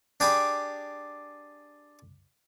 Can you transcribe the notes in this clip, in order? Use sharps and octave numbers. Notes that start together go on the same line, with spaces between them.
D4 G4 G#4 G#5 B5 D6